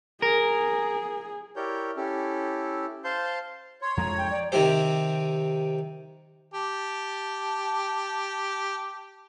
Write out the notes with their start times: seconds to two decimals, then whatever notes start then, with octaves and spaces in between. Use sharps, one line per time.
0.22 G#4 A#4
1.56 E4 G4 A#4 C#5 D5 G6
1.97 C#4 E4 G4 A4
3.04 C5 F5 A5 C6 G6
3.82 C#5 C6
3.97 F2 F3 G#3 A#5
4.18 G5
4.31 D5
4.52 C3 D#3 C4 G4 C5
6.54 G4 A5